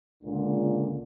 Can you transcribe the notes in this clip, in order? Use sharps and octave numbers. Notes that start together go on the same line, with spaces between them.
C#2 A#2 D3